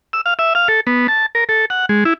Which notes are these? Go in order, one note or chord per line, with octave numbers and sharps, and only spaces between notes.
E6
F5
E5
F5
A4
B3
A5
A#4
A4
F#5
G#3
E4